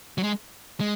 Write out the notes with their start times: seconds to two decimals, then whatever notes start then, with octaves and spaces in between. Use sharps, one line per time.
0.18 F#3
0.23 G#3
0.80 G#3